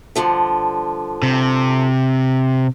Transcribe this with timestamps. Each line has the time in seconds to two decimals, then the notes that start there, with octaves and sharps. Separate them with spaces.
0.16 G2 D3 F3
1.22 C3